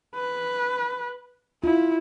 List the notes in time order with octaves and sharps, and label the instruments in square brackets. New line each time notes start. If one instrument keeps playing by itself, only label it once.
[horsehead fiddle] B4
[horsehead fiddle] E4 [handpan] F4